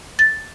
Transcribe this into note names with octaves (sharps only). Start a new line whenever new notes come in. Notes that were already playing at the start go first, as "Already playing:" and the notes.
A6